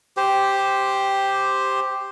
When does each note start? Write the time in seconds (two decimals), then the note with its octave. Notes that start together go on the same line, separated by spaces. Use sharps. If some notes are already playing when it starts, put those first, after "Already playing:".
0.17 G4 C5